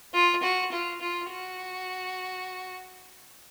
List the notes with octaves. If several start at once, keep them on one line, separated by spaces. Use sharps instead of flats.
F4
F#4
F4
F4
F#4